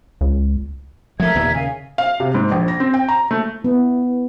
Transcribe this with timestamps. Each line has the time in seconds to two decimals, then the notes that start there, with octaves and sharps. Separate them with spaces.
0.21 C#2
1.20 F3 A3 A#4 E5 G#6
1.35 D#2 A#2 D#3
1.54 C#3 F5 G#5
1.98 F5
2.20 C3
2.35 G#2
2.52 A#1
2.68 A#6
2.80 C4
2.94 G5
3.08 A#5
3.31 A3
3.64 B3 E4